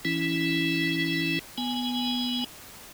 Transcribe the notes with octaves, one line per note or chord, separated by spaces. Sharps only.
E3 C#4 E4
B3 G#5